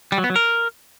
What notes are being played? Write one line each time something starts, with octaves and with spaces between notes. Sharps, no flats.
G3
F#3
B3
F#3
A#4